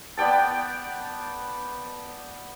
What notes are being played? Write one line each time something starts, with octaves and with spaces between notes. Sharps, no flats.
B3 D5 G5 A5